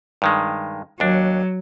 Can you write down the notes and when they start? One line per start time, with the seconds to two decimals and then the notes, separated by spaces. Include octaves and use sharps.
0.22 G2 D#3 G#3
1.00 D#2 F#3 D4